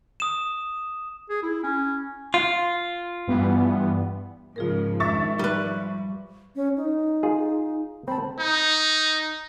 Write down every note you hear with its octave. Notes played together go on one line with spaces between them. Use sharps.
D#6 E7
G#4
E4
C#4
F4
G2 E3 B3
G#2 C#3 F3 F4 G#4 A#4
G#2 D#3 D4 E5 C#6 A6
F3 G3 B4
C#4
D#4
F4 G#4
C4 A5 B5
D#4